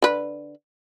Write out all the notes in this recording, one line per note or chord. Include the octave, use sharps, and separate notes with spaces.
D3 B4